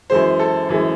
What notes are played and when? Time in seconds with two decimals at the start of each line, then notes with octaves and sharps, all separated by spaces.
0.10 F#2 E3 G#3 C5
0.39 A4
0.69 F#2 E3 G#3